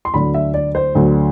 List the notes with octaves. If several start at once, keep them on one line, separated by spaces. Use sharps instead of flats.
C6
D2 D3 F#3 B5
E5
D5
C5
D2 D3 F#3